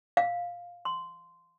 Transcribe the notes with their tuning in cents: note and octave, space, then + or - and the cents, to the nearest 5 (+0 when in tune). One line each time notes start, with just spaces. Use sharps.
F5 +10
C6 -10